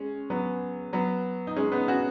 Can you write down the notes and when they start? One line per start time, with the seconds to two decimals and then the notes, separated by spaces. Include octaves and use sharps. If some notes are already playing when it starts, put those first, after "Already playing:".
Already playing: G#3 C#4
0.30 F#3 B3
0.93 F#3 B3
1.47 D#4
1.56 G#3 C#4
1.72 B3 D#4
1.88 C#4 F#4